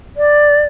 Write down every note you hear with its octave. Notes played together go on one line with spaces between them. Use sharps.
D5